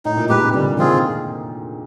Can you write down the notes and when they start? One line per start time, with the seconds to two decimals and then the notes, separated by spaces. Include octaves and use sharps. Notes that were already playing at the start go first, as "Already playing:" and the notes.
0.05 A2 D#4
0.17 A#2
0.29 G#2 G4 B4
0.42 C3
0.54 D3 G3
0.78 D#3 C4 F4 G#4